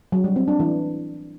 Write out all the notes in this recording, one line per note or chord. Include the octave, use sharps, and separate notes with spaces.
F#3
G3
C4
D4
E3